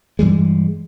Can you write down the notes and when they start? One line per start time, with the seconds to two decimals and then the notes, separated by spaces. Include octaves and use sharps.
0.19 G2 E3 G3 G#3